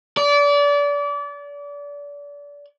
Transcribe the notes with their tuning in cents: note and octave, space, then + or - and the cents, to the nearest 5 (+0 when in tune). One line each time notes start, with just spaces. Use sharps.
D5 -30